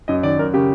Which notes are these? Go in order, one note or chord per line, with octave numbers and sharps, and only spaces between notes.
F#2 D#5
D#3 D5
F#2 A#4
C#3 G4